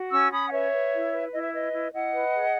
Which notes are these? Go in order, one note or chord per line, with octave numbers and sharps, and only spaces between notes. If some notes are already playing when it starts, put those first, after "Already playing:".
Already playing: F#4
C#4 C#6 E6
C#4 B5 D#6
F#5
B4 C#5 E5
B4
E4
B4
E4 D#5
E5
B4 D#5
E4
E4 D#5 F#5
B4
G#4